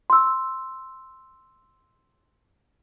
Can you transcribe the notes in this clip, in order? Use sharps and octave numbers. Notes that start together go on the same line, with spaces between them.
C6 E6